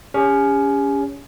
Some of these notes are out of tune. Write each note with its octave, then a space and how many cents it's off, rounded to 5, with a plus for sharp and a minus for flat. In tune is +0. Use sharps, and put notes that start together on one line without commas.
C#4 +20 G4 +45